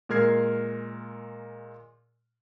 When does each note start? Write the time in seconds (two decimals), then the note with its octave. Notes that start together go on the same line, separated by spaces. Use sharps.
0.09 A#2 G#3 A#4 F6 G#6 C7